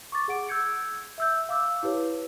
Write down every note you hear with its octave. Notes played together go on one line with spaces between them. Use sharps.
C#6 D6 A6
G#4 F#5 D7
E6 G6 G#6 C#7
E5 E6 G6
F5 D6 E6
E4 G4 B4 C#5